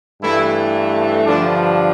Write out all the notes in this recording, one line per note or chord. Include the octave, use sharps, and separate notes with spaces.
G2 E3 A3 E4
G2 D3 F3 D4